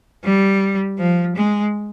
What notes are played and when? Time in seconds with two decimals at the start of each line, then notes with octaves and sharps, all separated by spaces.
0.24 G3
0.98 F3
1.36 G#3